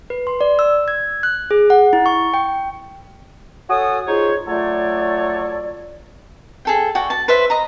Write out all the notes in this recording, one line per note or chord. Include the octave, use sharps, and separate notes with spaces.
B4
C6
D5
E6
G#6
F#6
G#4
F#5
E4
C#6
G5
F#4 A4 C#5 G#5 D#6
D#4 F4 G#4 C5 C#5
F#3 A3 F4 A4 C#5 D5
G#4 A4 G5
F#4 D5 G5
A5
B4 C5 E5
D#5 A#5